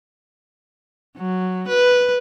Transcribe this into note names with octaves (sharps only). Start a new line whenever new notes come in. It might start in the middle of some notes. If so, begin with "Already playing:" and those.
F#3
B4